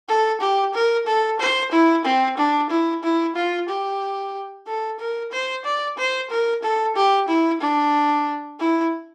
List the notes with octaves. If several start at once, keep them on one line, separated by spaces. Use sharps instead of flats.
A4
G4
A#4
A4
C5
E4
C4
D4
E4
E4
F4
G4
A4
A#4
C5
D5
C5
A#4
A4
G4
E4
D4
E4